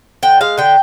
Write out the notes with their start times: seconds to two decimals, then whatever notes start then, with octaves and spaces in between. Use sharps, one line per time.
0.23 D3 G5
0.41 G#3 F5
0.58 D3 G5